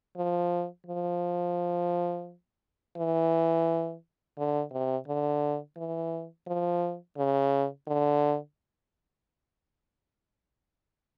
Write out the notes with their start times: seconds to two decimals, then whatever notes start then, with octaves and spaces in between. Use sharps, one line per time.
0.17 F3
0.87 F3
2.97 E3
4.38 D3
4.72 C3
5.08 D3
5.77 E3
6.47 F3
7.17 C#3
7.87 D3